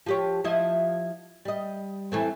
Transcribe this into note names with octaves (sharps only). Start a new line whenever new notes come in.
F3 G4 C#5
F3 E4 D#5
G3 D#5
E3 A3 C4